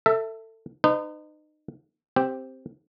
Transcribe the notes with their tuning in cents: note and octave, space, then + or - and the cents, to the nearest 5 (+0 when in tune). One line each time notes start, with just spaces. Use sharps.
A4 +25 E5 +0
D#4 -30 B4 +40
C4 +0 G4 +0